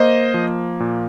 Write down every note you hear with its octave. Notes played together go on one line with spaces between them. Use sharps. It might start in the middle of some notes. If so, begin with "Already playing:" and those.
Already playing: A#3 C5 D#5
F3
A#2